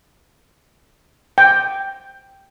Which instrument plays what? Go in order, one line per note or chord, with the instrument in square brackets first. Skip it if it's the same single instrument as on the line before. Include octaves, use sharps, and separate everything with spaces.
[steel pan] G5